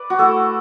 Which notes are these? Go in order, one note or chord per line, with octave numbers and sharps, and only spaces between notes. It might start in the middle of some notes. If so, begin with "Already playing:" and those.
Already playing: B4 D5
F#4
A3 E4 A4